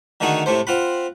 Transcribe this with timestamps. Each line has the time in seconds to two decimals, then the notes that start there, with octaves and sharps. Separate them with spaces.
0.21 D3 D#3 A3 D#4 F#4 G#4
0.46 A2 C3 A3 C5
0.67 C4 F4 F#5 B5